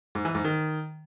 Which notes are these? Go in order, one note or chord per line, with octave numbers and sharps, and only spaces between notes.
G#2
E3
G#2
D#3